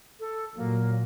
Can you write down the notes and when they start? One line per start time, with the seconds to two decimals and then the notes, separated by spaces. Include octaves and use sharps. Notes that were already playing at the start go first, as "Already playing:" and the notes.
0.20 A4
0.56 A#2 F#3 A#3